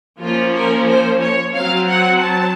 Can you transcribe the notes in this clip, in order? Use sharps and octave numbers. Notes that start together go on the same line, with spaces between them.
F3 A#3 C#4 F4
A#4
C5
C#5
F#3 C4 F5
F#5
A5